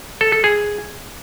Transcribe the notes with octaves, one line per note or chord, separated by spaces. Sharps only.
A4
A4
G#4